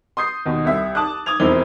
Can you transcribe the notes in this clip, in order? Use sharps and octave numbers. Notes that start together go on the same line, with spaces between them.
C6 D#6 G6 C7
D#2 B2
C2 E5
A5 D6 D#6 F#6
D6 D#6 G#6 F7
E1 F2 C4 E4 G7